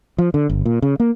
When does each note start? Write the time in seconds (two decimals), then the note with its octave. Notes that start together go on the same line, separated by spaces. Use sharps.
0.18 F3
0.34 D3
0.50 G1
0.65 A#2
0.82 C#3
1.00 A#3